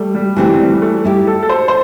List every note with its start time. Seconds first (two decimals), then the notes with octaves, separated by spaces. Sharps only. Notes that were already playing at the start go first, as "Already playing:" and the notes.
Already playing: G3 A3
0.15 G3
0.36 D3 E3 A3 C4 G4
0.59 G3
0.82 A3
1.04 G3 E4 G4
1.27 A4
1.43 A4
1.49 C5
1.68 C5